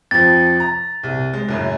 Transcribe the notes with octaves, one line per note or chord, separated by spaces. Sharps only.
F2 F3 A6
A#5
C2
G#3
C#2 F#2 A2